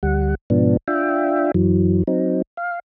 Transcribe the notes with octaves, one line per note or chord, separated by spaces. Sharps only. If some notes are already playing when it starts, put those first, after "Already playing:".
D2 G3 F#5
G#2 B2 F3 B3 D4
D4 F4 E5 G5
F#2 E3 F#3
F#3 C4 D#4
F5